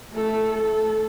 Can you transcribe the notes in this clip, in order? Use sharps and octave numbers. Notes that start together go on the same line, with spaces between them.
A3 A4
A4